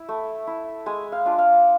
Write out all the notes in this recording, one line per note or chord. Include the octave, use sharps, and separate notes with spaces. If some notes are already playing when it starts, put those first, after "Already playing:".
Already playing: E4
A3
E4
G#3 G#5
F5
D4 F4
F5